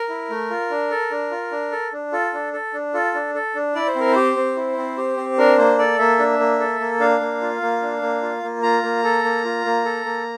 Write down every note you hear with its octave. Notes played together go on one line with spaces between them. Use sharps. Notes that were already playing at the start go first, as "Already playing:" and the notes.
Already playing: A#4
E4
A3
F4
D4
A4
D4
F4
D4
A4
D4
F4 A4
D4
A4
D4
F4 A4
D4
A4
D4
E4 D5
C5
C4 A#4
G4 C5
C4
E4
C4
G4
C4
D4 A#4
A#3 C5
A4 D5
A#3 E5
D4
A#3
A4
A#3
D4 F5
A#3
F4
A#3
D4
A#3
F4
A#3
F4 A#5
A#3
A4
A#3
F4
A#3
A4
A#3